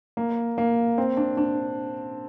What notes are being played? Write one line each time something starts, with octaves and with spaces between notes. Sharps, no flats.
A#3
A#3
C4
D4
D4